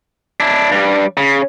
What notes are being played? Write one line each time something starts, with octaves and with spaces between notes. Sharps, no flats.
D4 E4
G2 G3
C#3